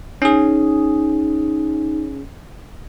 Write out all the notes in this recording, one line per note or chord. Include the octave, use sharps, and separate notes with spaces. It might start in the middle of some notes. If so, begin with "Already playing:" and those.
C#4 D#4 G#4